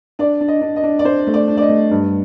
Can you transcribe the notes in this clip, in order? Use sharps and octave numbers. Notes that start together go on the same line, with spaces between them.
D4 D5
D4
D#5
D4
D#5
D4
D5
D4 C5
A3
D5
D4
D5
D#5
A3
G2